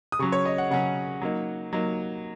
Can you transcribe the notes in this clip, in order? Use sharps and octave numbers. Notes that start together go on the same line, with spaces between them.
D#6
C#3 F#3 C#4 C#6
C#5
D#5
F#5
C#3 F#3 C#4 F#5
F#3 A#3 D#4
F#3 A#3 D#4